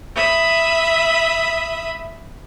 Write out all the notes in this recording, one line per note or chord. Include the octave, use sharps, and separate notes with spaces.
E5 B5 D#6